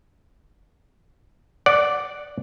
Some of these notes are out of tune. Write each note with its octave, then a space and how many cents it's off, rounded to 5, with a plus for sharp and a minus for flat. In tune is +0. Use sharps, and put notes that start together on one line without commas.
D5 -5 F#5 +0